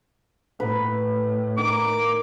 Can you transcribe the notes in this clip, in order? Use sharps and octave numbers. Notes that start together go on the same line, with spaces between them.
A2 B4
D#3 D6